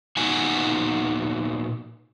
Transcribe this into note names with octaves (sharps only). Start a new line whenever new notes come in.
A#2 B3 D#4 F#4 F#5 G#5